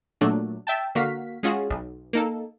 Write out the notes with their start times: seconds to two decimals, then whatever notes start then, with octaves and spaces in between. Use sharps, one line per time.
0.21 A#2 F#3 A3 D4
0.67 E5 G5 A5
0.95 D3 A#3 F#4 F5 B6
1.43 G#3 C#4 F4 F#4 G#4
1.70 B1
2.13 A#3 D#4 A4